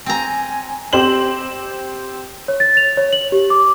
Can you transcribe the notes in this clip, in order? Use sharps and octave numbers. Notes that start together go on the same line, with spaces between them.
C4 G#5 A#5
C4 G4 C5 F#7
C#5
A6
F7
C#5
F#7
G4
D6